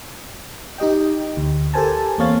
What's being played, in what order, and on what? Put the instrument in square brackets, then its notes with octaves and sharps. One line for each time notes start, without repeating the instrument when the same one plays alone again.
[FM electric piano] D#4 G4 D#5 G5
D2
G4 A4 A#4 C5 G#5 A5
E2 A#3 C4 C#5 F5 A6